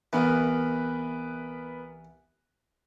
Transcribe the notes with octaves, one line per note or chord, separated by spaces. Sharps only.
C2 E3 B3 A#4 B4